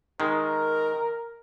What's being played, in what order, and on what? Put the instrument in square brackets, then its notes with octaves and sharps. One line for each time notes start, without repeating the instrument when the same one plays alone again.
[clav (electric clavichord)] D#3 G#3 [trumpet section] A#4